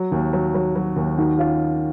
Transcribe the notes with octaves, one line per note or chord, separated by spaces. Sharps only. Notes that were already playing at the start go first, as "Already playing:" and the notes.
Already playing: F#3
D#2
F#3
F#3
F#3
D#2
D#3 D#4 F#4
C#4 F4